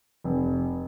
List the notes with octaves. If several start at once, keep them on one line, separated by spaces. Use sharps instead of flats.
F1